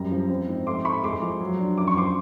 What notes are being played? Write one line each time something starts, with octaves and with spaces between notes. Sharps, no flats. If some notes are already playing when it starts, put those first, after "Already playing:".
Already playing: F#2 G3 A#5
F3
C4
G#2
A3 C6 D6
A3 B5 C#6
G#3 C6 D6
F3
F#3
D4
F#2 D6
C#6
F3 C6 D6